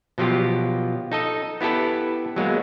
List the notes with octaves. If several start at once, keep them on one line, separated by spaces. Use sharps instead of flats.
B2 F3 F#3 F4 G4
D#4 A4 D#5
B3 E4 G4 A4 B4
F#3 G#3 A#3 B3